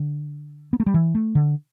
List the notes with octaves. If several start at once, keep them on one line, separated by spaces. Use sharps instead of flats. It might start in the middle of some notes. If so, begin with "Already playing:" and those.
Already playing: D3
B3
A3
G3
E3
A3
D3